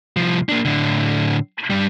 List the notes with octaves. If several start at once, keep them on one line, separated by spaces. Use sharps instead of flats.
C2 F3
A#3 D4
A2 D3
G2 G3